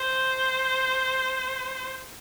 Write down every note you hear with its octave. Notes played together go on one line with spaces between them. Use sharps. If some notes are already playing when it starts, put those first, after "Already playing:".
Already playing: C5